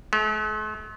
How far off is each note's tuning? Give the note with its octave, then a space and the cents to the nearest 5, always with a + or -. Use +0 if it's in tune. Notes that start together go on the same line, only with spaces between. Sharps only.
A3 -45